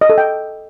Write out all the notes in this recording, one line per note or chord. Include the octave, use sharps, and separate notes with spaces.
D#5
A4
G5